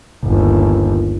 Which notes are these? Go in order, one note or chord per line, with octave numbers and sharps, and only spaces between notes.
G1 D#2